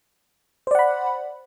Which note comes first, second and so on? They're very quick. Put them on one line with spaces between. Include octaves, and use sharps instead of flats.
C5 D5 F#5 B5